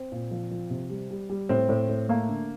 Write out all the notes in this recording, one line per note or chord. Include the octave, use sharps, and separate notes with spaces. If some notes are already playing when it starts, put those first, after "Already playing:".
Already playing: C4
A#2
F3
F3
C3
G3
G3
G3
A2 C4
A2
A2
A3 A#3
D3